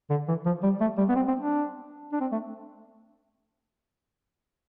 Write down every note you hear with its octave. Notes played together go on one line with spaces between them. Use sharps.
D3
E3
F3
G3
A3
G3
B3
C4
C4
D4
D4
C4
A3